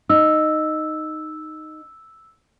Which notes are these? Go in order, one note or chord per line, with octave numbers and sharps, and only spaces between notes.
D#4 E6